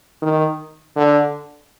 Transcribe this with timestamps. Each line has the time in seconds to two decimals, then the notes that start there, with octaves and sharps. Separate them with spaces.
0.22 D#3
0.96 D3